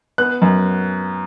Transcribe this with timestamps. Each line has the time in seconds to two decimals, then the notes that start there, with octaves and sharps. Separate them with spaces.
0.18 B3 F#6
0.42 F#2